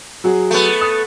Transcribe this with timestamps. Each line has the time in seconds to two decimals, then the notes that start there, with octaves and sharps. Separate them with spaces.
0.24 F#3 F#4 G#4
0.51 A3 B3
0.81 D#6